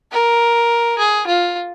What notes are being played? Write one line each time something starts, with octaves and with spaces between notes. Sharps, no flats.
A#4
G#4
F4